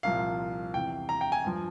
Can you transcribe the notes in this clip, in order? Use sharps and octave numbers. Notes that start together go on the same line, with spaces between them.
C2 A#2 F3 F5
E2 C3 E3 G5
A#5
G5
G#5
G2 F3